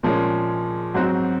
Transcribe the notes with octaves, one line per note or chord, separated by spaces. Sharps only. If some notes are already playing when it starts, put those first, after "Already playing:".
A#2 F3 G#3 C#4
G#2 F#3 C4 F#4